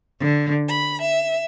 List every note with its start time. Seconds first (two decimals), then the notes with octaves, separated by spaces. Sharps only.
0.20 D3
0.69 B5
1.01 E5